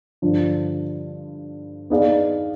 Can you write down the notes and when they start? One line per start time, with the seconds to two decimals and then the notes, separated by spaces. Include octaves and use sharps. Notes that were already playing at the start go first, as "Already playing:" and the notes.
0.22 G2 D3 F3
1.90 B3 D#4 G#4 D5 F5